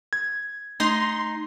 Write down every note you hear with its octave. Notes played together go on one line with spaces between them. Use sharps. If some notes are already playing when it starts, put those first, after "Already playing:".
G#6
A3 D#4 C6